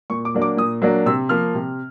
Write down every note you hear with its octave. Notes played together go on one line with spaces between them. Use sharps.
A#2 C#6
D6
F#3 A#3 D4
D6
A#2 D#6
F#3 A#3 D4
C3 E6
F3 A#3 F6
C3